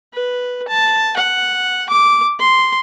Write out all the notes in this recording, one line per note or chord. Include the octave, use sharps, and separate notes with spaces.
B4
A5
F#5
D6
C6